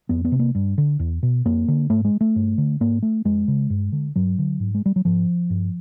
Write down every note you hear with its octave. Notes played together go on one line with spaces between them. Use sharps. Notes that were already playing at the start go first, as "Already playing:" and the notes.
F2 B3
B3
C3
A#3
G2
D3
E2
B2
F2 A#3
D3
G#2 A3
G#3
A3
G2
D3
G#2 A#3
A3
F2 G#3
C#3
G2
D3
G2 F#3
D3
G#2
G#3
G3
F#3
G#2 F3
G2